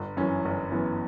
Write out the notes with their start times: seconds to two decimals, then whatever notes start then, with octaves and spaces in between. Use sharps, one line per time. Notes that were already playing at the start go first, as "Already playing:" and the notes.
Already playing: G1
0.17 F#2 E3 C#4
0.45 G1
0.72 F#2 E3 B3